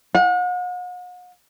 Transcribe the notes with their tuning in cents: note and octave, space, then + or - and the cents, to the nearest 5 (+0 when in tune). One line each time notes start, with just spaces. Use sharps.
F#5 -45